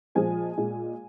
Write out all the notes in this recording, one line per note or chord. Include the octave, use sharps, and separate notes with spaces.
A#2 F3 G#3 G#5
A#2 G#3